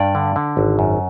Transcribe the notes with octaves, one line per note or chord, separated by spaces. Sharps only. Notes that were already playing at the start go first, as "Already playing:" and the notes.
Already playing: G2 D5
D3
D3
G#1
F#2